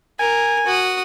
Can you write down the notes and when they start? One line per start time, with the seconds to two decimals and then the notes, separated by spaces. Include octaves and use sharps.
0.19 A#4 G#5
0.66 F#4 D#6